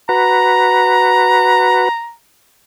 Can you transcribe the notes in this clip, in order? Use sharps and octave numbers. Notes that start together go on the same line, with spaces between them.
F#4 B4 A#5